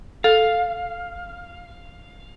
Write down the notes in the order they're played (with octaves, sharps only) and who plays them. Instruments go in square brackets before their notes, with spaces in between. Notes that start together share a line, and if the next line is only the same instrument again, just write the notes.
[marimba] A4 [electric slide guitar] F5